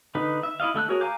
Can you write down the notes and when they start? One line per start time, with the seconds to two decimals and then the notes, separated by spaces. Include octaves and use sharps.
0.15 D3 D#4 B4
0.43 E5
0.60 E4 C#5 D#5 F5
0.74 D3 A3 E6 F#6
0.89 F#4 G#4 A#4 C#5
1.01 F5 G#5 A#5 D6 G6